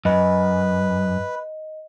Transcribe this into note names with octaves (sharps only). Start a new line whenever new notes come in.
F#2 B4 D#5